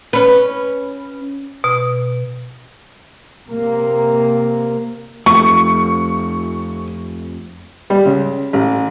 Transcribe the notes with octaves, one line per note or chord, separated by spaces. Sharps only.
C#4 B4
B2
C3 A#3
F2 A3 C#6
G3
C#2
A1